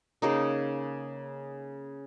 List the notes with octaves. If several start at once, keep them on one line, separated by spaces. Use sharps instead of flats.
C#3 A#3 D#4